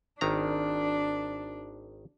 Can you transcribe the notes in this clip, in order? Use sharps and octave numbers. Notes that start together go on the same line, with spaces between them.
G#1 D#3 D4 A#5